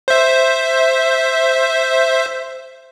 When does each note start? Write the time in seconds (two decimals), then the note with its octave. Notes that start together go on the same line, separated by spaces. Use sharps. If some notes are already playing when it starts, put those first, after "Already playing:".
0.08 C5 E5